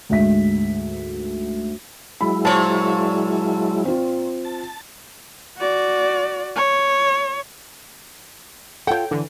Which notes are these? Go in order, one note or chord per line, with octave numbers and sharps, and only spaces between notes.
D2 G#2 G#3 E5 B6
F#3 G#3 E4 B5
A#2 C5 C#5 A5
C4 F4
A5
F#4 D5
C#5
F4 A4 C#5 F#5 G5
D3 E3